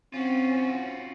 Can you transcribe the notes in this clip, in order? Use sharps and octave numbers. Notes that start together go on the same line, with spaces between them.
C4 C#4 F4 F#4